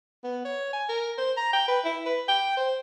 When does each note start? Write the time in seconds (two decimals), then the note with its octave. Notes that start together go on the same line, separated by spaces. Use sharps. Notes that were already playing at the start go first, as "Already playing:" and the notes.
0.24 B3
0.45 C#5
0.73 G#5
0.89 A#4
1.18 C5
1.37 A#5
1.53 G5
1.68 B4
1.85 E4
2.06 B4
2.29 G5
2.57 C5